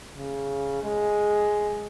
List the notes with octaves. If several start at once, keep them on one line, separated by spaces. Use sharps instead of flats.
C#3
G#3